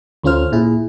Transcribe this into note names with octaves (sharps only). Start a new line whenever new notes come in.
D2 A3 C#4 F4 C5 F6
A#2 E4 G#4